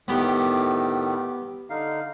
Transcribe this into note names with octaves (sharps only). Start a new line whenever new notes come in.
A2 D#3 B3 G4
D3 D#4 F5